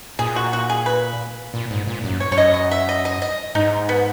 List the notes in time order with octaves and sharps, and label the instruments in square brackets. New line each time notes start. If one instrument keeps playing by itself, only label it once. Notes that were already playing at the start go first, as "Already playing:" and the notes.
[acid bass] A#2 [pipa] G#4
[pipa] F#4
F#4
G#4
B4
[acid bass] A#2
G#2
A#2
F#2
[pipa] C#5
[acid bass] F#2 [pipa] C#5
[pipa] D#5
D#5
E5
D#5
D#5
D#5
[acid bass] G#2 [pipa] D#4
[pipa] B3